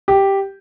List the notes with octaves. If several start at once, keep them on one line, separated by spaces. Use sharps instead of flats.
G4